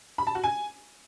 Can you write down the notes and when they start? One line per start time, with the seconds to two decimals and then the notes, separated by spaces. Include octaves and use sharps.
0.18 B5
0.27 A5
0.35 F#4
0.44 G#5